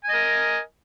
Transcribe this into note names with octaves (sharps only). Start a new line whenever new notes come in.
A#4 D#5 G#5